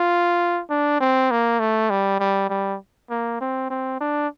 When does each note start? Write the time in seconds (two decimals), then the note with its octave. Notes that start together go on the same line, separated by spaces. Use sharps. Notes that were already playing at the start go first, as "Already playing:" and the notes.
Already playing: F4
0.70 D4
1.00 C4
1.31 A#3
1.60 A3
1.90 G3
2.20 G3
2.50 G3
3.10 A#3
3.41 C4
3.70 C4
4.01 D4